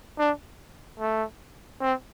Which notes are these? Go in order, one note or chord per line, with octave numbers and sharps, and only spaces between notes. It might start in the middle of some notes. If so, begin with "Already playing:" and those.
D4
A3
C4